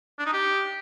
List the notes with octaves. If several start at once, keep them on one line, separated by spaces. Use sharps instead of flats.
D4
D#4
G4